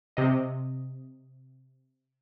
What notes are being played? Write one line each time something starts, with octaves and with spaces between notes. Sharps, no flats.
C3 D#5